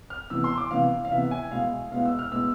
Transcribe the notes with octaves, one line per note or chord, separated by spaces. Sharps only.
F6
C3 E3 B3 E6
C6
D6
C3 E3 B3 F5
F5
C3 E3 B3 E5
G#5
B2 G#3 B3 E4 F5
B2 G#3 B3 E4 F5
E6
F6
B2 G#3 B3 E4 E6